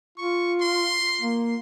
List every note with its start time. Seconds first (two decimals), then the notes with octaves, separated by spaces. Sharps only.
0.18 F4 C#6
0.61 C6
1.21 A#3